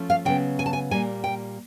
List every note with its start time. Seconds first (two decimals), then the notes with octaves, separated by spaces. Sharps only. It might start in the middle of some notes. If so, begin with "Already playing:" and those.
Already playing: F3 A3 C#4
0.10 F5
0.25 C#3 F#3 B3 G5
0.59 G#5
0.66 A5
0.73 G#5
0.91 A#2 G3 A#3 G#5
1.24 G5